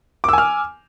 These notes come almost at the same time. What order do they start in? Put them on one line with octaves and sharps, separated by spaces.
D6 E6 G#5 F6